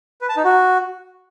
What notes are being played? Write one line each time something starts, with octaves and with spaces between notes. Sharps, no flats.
B4
A5
D#4
F#4